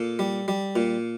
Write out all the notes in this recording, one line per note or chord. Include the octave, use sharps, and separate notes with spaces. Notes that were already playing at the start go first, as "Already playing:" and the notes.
Already playing: A#2 A4
G3
G3
A#2